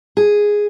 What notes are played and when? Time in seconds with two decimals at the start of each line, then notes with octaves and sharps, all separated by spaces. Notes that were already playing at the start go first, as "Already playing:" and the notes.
0.17 G#4